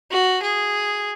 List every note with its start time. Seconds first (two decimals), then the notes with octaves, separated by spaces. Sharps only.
0.11 F#4
0.43 G#4